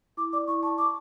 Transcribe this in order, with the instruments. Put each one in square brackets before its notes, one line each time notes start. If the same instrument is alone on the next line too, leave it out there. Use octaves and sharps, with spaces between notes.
[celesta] E4 [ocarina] D6
[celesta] D5 [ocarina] D6
[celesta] E4 [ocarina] C#6
[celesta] A5 [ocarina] C#6
[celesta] C#6 [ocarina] D6